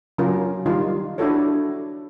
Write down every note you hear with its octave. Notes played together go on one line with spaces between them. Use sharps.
C#3 F#3 C#4 F4 A#4
D#3 G3 D#4 F4
D4 E4 F#4 A4 C#5